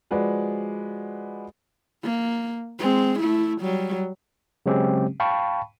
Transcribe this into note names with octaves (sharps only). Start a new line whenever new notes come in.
F3 G#3 F#4 B4 D5
A#3
G#3 C4
A3 E4
F#3 G3
C#3 F#3 G#3 C4 C#4 G4
F5 G5 A5 B5 C#6